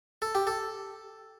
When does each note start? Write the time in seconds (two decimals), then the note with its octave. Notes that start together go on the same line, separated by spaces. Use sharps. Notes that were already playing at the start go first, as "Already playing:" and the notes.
0.22 A4
0.35 G4
0.47 A4